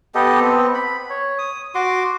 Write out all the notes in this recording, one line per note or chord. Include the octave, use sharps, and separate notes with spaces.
B3 G4 A4 D#5
B3 C4
B5
C#5
D#6
F#4 C6 D6